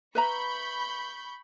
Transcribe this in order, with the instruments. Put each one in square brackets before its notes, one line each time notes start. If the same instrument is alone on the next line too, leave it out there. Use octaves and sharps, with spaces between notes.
[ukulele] B4 E5 A#5 [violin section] B5 C#6 G6